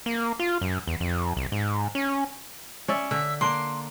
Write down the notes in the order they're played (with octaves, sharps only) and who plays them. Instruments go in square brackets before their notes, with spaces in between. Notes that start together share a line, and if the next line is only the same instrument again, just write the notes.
[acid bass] A#3
F4
F#2
E2
F2
C2
G#2
C#4
[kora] C#4 D5 E5
[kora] D3 [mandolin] E5
[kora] A#3 D4 [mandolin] C6